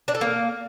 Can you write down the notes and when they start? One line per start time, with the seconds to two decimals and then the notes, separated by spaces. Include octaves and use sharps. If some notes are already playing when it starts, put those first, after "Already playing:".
0.08 D4
0.15 A4
0.21 A#3